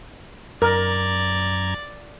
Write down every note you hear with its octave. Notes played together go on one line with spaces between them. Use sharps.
F#2 A#4 D5 A#5 G#6